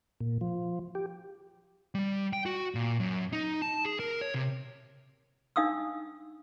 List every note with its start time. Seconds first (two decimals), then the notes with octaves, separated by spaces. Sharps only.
0.21 A#2
0.41 F3
0.95 G4
1.95 G3
2.33 G5
2.46 F#4
2.75 A#2
3.00 F#2
3.33 D#4
3.62 A5
3.85 G#4
4.00 A#4
4.21 C#5
4.34 C3
5.56 D4 D#4 F5 D#6 E6